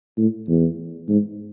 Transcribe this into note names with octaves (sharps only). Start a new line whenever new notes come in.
A2
E2
G#2